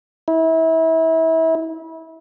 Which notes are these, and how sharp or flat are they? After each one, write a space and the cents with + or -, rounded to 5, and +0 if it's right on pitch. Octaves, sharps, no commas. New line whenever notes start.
E4 -30